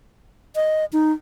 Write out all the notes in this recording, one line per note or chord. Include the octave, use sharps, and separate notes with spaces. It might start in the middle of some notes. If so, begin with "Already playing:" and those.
D#5
D#4